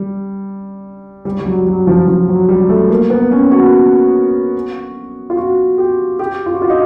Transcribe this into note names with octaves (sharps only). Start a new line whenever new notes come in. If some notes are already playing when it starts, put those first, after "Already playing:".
Already playing: G3
G3
G3
F#3
F#3
F3
F3
F#3
G3
A3
A#3
B3
C#4
F#4
F4
F#4
G4
G4
F4
F#4
F4
D#4